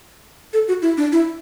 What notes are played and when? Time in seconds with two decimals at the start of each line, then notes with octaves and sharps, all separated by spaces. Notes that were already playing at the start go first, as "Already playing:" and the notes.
0.53 A4
0.68 F#4
0.82 E4
0.97 D4
1.12 E4